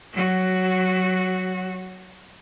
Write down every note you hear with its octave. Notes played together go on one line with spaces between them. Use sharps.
F#3 F#4